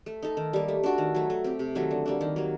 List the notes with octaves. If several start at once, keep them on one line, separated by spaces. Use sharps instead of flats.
A3
D#4 A4
D#3
G3 A#3
A3
D4 F#4 A4
D#3
F#3 A3
A3
C4 G4
C3
D#3 F#3 A3
D3
G3 A#3 D4
D#3
F#3 A#3